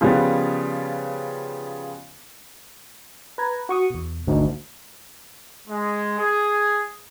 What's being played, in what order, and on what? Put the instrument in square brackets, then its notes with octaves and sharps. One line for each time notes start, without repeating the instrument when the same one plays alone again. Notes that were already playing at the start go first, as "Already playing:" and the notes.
[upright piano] C#3 F3 G3 B3
[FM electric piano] B4 A#5 G#6
F#4 C#6 D#6
E2 B2
[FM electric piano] G#1 D#4 [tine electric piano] D2
[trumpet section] G#3
G#4